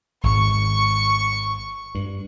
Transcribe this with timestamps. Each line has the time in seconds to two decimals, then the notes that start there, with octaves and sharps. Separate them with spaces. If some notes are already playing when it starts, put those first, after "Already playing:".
0.23 G#1 C#6
1.95 G2